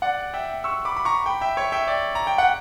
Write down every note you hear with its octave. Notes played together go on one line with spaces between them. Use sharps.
D5 F#5
E5 G5
C#6 E6
B5 D6
B5
A#5 C#6
G5 B5
E5 G5
C#5 E5
E5 G5
D5
A#5
G5
F#5